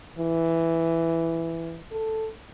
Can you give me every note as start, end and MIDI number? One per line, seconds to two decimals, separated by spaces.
0.19 1.80 52
1.91 2.29 69